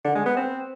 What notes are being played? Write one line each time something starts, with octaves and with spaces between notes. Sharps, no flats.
D3
G#3
B3
C4